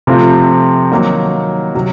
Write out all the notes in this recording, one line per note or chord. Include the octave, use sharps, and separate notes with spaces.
C3 F3 A3 C4 F4
D#3 F#3 A#3 D#4 F#4
C3 F#3